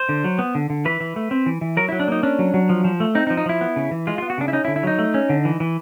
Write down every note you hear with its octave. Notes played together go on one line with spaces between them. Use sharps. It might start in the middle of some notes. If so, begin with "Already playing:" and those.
Already playing: C5
D3
F#3
B3
D3
D3
E3 B4
E3
A3
C4
E3
E3
F#3 A#4
E4
F#3
D4
A#3 D#4
C#4 D4
F#3
F#3
F3
F3
A3
C4 D#4
D#4
F3
D#4
F3 E4
B3
C#3
E3
G#3 F4
F4
B3
F#4
C#3 D4
E4
C#4 D#4
E4
D3
E4
F#3 D#4
A3
C#4
D3
E3
E3